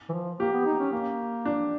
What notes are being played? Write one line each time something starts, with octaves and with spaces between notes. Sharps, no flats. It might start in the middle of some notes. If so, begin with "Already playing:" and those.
E3
F3
A#3 G4
B3
D#4
C#4
A#3
D4